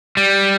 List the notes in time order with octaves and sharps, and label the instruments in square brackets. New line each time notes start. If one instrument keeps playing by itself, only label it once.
[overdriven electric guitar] G3